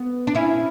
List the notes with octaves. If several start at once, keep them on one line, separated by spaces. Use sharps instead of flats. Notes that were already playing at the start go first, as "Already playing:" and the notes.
Already playing: B3
D4
C#4 E4